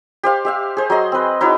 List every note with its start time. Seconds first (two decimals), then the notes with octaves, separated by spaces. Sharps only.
0.23 G4 C5 F5
0.45 G4 E5 F5
0.77 G#4 C5
0.90 F#3 G#4 D#5 C6
1.12 C4 B4
1.41 D#4 E4 F#4 C#5